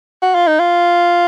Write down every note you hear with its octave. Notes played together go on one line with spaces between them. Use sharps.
F#4
F4
D#4
F4